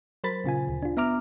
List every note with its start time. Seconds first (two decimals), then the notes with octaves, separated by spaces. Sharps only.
0.24 F#3 A#4 C5 B5 A6 B6
0.44 A#2 C#3 F4 G#5
0.68 D2
0.83 D4 F4
0.97 B3 E5 A#5 D6 F6